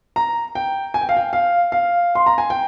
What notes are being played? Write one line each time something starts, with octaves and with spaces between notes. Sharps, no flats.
A#5
G5
G#5
G5
F5
G5
F5
F5
C6
A#5
G#5
G5